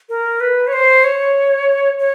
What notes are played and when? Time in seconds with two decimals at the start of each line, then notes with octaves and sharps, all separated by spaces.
0.09 A#4
0.40 B4
0.67 C#5
0.73 C5
1.04 C#5
1.99 C#5